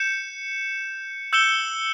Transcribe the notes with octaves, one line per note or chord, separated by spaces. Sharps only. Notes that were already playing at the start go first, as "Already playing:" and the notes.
Already playing: G6 C#7 E7
E6 G6 C#7 E7 G7